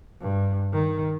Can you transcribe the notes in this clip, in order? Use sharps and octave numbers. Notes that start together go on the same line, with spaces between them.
G2
D#3